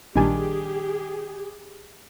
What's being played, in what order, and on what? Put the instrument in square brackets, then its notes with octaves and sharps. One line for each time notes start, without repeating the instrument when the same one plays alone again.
[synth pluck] A#1 G#5 A5 [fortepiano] D#3 G3 D4 [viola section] G4 G#4